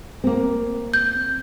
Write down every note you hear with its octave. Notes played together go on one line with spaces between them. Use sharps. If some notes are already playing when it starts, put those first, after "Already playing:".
A#3 C4
G6